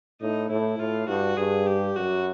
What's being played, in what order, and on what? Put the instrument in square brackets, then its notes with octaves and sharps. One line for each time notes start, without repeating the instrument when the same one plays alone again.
[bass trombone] A2 [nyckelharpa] D#4
[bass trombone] A2 [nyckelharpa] E4
[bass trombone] A2 [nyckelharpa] F4
[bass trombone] G2 [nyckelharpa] F#4
[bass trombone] G2 [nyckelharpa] G#4
[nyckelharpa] G4
[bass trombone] F#2 [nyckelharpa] F#4